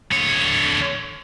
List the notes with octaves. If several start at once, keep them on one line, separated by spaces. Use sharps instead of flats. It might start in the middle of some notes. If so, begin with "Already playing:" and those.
D3 C#5